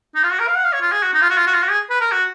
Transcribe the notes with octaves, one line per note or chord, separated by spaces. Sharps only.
D#4
F4
F#4
A#4
F5
F#5
F5
C#5
F4
G#4
F#4
D#4
F4
F#4
F4
F#4
F4
F#4
G#4
B4
A#4
F#4